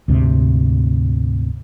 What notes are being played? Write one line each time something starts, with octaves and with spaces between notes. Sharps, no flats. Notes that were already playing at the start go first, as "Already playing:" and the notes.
D2 G#2 C3